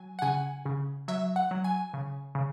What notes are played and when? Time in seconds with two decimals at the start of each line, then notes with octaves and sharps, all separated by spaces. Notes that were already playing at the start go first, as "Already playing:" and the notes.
Already playing: F#3 G#5
0.19 F#5
0.22 C#3 G#5
0.65 C#3
1.08 F#3 E5
1.36 F#5
1.51 F#3
1.64 G#5
1.94 C#3
2.35 C#3